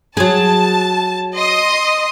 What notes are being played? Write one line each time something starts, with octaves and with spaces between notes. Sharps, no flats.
F#3 G#4 A5
D#5 C6 D#6